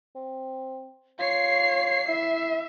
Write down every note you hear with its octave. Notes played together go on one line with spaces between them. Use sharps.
C4
F4 C#5 C7
E4 E5